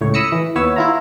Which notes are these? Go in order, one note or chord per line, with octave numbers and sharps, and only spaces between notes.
C#2 A2 C#5
B5 D#6 E6 A#6 C#7
E3
D#2 B3 C#5 E5 E6
E4 F4 A#5